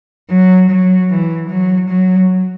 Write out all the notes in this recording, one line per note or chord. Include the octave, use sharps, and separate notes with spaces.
F#3
F#3
E3
F#3
F#3